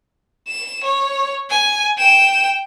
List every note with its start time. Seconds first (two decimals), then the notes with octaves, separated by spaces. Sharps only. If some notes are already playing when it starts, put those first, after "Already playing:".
0.48 E7
0.84 C#5
1.50 G#5
1.98 G5 E7